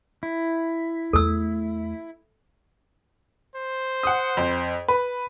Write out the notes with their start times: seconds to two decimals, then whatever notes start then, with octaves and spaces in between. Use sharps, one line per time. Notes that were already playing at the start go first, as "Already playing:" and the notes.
0.23 E4
1.13 E2 A3 A4 E6
3.56 C5
4.03 F#5 D#6
4.37 F2
4.88 B4